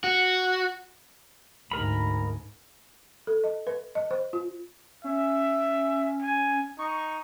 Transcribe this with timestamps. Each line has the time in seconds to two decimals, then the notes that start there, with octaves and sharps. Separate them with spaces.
0.04 F#4
1.72 D2 G#2 A#4 B5
3.27 A4
3.44 D#5
3.67 B4
3.95 D#5
4.11 C5
4.33 F4
5.04 C#4 E5
6.22 G#5
6.79 D#4 C#6